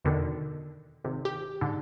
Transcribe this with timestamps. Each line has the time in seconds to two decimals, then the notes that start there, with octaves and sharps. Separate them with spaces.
0.05 E2 B2 D3 D#3
1.04 G#1 C3
1.25 G4
1.61 G#2 D3